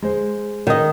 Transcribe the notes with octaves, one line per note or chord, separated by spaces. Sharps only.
G#3 C5
D#3 D#5